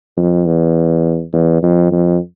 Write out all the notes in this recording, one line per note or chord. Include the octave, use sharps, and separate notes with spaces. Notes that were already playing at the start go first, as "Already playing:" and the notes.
F2
E2
E2
F2
F2